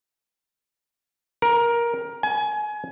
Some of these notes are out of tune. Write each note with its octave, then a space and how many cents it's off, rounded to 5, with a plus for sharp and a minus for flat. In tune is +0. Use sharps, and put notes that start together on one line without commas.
A#4 +15
G#5 +25